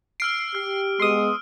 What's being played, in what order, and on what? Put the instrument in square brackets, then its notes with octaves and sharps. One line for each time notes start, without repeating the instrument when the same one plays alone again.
[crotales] E6 F6 D7 [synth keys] C7
[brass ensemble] G4 [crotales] F6
[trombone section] G#3 B3 [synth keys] C6 D#6